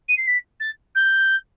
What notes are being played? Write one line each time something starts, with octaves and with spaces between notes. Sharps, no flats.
D#7
C7
B6
A6
G6